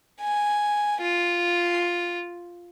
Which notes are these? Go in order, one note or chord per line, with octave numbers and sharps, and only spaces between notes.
G#5
F4